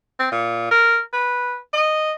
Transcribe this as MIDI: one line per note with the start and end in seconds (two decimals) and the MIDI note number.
0.19 0.28 60
0.32 0.66 46
0.71 0.99 70
1.13 1.56 71
1.73 2.11 75